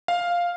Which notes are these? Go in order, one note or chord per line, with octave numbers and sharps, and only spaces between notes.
F5